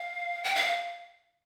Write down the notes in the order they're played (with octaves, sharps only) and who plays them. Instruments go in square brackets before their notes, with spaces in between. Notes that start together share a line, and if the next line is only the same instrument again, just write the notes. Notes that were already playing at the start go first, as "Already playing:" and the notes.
Already playing: [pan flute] F5
G5
F5